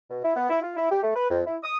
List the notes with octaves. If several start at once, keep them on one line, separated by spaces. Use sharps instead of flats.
B2
E4
B3
E4
F4
E4
G4
A3
B4
F2
E4
D#6